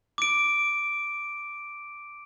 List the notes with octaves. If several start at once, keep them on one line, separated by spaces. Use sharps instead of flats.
D6 D7